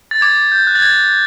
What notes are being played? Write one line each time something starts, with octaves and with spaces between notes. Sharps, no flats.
A6
D6 G#6
G6
F#6
A6
G#6